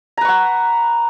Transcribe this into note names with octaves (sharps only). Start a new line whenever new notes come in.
B4 F#5 A#5 C#6